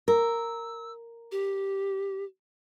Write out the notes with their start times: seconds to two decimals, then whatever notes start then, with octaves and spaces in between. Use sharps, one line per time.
0.08 A#4 E6
1.32 G4